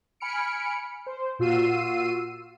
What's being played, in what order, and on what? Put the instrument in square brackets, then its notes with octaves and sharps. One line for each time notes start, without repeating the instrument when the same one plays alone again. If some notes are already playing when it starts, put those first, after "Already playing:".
[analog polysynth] G#5 B5 F6 C#7 D7
C5
A#2 F4 F#4 E6 C7 D#7